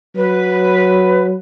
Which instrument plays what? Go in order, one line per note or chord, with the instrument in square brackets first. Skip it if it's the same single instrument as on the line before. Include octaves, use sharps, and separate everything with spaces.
[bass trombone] F#3 [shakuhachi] B4